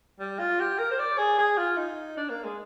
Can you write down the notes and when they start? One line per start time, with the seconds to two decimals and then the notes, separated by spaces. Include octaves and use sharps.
0.19 G3
0.39 F4
0.60 G4
0.79 A#4
0.91 C5
0.99 D5
1.18 G#4
1.38 G#4
1.58 F4
1.77 D#4
2.17 D4
2.30 A#3
2.44 G#3